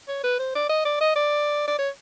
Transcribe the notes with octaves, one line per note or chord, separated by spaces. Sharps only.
C#5
B4
C5
D5
D#5
D5
D#5
D5
D5
C#5